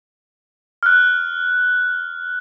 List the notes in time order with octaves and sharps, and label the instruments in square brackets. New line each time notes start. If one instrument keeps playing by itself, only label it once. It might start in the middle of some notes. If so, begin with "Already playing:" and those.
[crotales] F6 F#6